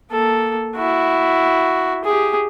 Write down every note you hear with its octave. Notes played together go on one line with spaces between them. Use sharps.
A#3 A4
E4 F#4
G4 G#4